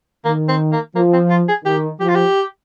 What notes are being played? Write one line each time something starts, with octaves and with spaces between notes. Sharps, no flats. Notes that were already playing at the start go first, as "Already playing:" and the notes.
D#3 A#3
C4
A#3
F3 A#3
C4
F4
G#4
D#3 G4
F3 G4
F4
G4